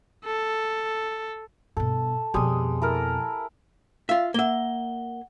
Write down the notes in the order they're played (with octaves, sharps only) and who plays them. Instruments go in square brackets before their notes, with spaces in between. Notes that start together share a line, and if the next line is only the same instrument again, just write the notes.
[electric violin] A4
[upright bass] G2 B2 [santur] A4
[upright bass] F2 B2 [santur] G3 G#3 D#6
[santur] E4 A4 A#4
[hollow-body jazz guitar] F4 E5 [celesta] F5
[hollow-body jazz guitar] A#3 E5 [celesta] F#5 G7